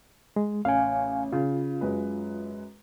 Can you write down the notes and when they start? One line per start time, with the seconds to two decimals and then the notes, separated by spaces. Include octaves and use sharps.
0.36 G#3
0.65 A1 F5 G#5
1.32 C#3 F4
1.81 F#2 G#3 B4